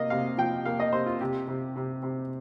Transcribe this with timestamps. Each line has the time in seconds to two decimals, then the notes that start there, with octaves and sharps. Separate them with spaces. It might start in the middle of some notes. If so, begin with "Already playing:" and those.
Already playing: C3 A#3 D#5 F5
0.10 C3 F5
0.38 F3 G5
0.65 A#3 F5
0.80 D#5
0.93 C3 C5
1.07 F4
1.21 C3 G4
1.48 C3
1.76 C3
2.03 C3